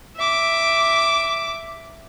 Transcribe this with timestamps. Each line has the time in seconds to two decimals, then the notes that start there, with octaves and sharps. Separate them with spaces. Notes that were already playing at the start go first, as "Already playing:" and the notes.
0.16 E5 D6